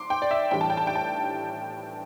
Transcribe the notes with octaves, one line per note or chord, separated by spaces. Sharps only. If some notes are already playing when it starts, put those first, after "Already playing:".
Already playing: C6 D6
G5
D5
E5
A2 E3 G3 D4 G5
A5
G5
A5
G5
A5